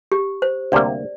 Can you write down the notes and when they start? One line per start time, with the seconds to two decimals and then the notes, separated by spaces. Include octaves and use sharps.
0.12 G4
0.42 C5
0.72 D2 C3 G3 A#3 D5